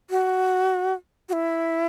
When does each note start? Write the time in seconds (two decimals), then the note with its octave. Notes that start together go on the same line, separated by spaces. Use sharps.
0.10 F#4
1.29 F#4
1.33 E4